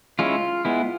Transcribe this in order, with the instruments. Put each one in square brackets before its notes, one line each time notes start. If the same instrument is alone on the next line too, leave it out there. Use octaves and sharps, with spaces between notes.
[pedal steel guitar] G#3 C#4 E4 F4
G#3 B3 E4